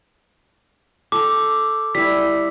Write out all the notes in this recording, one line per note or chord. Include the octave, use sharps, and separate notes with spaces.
A4 G5 D6
G3 E4 B6